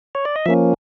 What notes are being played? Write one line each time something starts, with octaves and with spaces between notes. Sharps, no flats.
C#5
D5
D#5
F3 A#3 C#4 E5